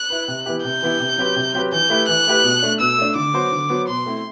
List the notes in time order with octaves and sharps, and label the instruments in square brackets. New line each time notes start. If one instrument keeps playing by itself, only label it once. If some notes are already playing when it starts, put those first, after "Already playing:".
Already playing: [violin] F#6
[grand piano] E4 B4
C3
E3 B3 E4 G4
[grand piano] C3 [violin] G6
[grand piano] E3 B3 E4 G4
C3
F#3 C4 G4 B4
C3
F#3 C4 G4 B4
[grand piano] E3 [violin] G6
[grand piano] A3 E4 G4 B4
[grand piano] E3 [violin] F#6
[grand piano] A3 E4 G4 B4
B2
A3 D4
[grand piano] B2 [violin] E6
[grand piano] A3 D4
[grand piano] D3 [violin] D6
[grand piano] F#3 B3 F#4 C5
D3
F#3 B3 F#4 C5
[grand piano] B2 [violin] C6
[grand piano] A3 C4 E4